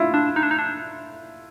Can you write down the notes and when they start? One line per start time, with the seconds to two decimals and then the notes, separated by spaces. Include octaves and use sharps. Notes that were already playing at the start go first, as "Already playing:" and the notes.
Already playing: E4 F4
0.14 D4
0.36 D#4
0.43 D4
0.51 D#4
0.59 D4